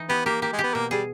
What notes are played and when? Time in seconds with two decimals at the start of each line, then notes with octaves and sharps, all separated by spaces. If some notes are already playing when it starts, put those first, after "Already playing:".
Already playing: E3 D#4
0.09 B3 G4
0.25 A#3 G4
0.41 A#3 G4
0.53 G#3
0.59 B3 G4
0.74 B2 A#3
0.91 G3 G#4